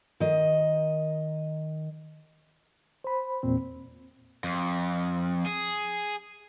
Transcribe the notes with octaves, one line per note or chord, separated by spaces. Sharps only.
D#3 D#5
C5 B5
E2 A#2 C4
F2
G#4